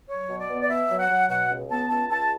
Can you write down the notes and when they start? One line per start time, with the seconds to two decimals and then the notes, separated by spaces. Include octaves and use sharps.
0.09 F#3 C#5
0.29 B2
0.39 D5
0.50 B3
0.62 D5
0.69 B2 E5
0.90 F#3
0.99 F#5
1.10 F#3
1.30 B2 F#5
1.50 C#2
1.70 B3 A5
1.90 C#2 A5
2.10 C#2 A5